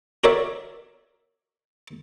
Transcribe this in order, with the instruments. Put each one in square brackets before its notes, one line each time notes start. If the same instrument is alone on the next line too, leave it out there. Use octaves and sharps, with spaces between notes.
[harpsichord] F#4 A#4 C#5 D5 E5